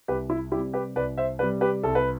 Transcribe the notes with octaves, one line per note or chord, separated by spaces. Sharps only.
C2 G4 B4
E4
C3 G3 E4 G4
G4 B4
C2 B4 D5
C5 E5
C3 G3 B4 D5
G4 B4
C2 A4
B4